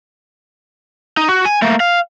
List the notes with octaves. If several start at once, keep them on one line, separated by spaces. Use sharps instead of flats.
D#4
F#4
G#5
A3 A#3
F5